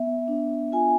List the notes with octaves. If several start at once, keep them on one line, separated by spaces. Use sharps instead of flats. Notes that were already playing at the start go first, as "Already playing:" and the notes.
Already playing: B3 E5
D4
F4 G#5